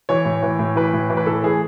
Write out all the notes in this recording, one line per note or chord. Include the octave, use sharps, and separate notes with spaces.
E3 C#5
A2
E3
A2
E3 B4
A2
E3
B4
A2 A4
E3 G#4